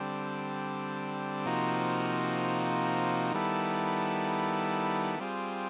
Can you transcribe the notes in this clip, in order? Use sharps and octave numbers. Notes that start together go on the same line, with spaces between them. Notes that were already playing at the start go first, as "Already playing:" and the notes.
Already playing: D3 G3 C4
C3 F3 A#3 D#4 F#4
D#3 G3 B3 E4 A4
G3 C4 F4 G#4